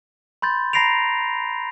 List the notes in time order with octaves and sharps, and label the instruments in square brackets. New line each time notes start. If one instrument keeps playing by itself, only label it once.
[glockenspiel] B5 C6 G6 A6
A#5 B5 A#6 C7 D7 F7